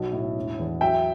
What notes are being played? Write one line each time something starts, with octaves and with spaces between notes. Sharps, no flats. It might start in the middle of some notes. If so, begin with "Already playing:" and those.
Already playing: B1 B2
A2
E1
E2
F#3 E5 G5